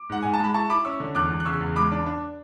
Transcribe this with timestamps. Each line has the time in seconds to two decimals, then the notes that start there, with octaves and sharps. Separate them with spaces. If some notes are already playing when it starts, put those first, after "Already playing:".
Already playing: D6
0.09 G#2 F#5
0.23 G#2 G#5
0.34 A5
0.39 G#3 B5
0.54 E4 A5 C#6
0.69 E4 B5 D6
0.85 C#4 C#6 E6
1.00 D3
1.15 E2 D6 F#6
1.30 E2
1.40 F#6
1.45 C#3 C#6 E6
1.61 E2
1.75 G#3 B5 D6
1.92 D4
2.06 D4